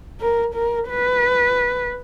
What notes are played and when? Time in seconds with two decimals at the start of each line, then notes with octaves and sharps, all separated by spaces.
0.20 A#4
0.55 A#4
0.89 B4